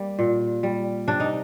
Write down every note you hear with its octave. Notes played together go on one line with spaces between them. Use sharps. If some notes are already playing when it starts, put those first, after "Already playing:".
Already playing: G3 A#3
A#2
G3
C3 D4
D#4